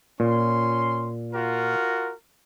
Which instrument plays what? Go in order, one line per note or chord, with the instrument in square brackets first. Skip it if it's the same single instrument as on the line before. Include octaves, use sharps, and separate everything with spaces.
[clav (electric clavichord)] A#2 [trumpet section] C#4 C6
[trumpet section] F4 F#4 A#4